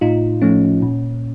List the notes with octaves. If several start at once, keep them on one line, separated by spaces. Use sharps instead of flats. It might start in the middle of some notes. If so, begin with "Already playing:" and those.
A2 D#4 F4
F3 A3 C#4
A#2